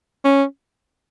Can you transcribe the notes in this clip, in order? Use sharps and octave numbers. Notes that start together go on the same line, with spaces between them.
C#4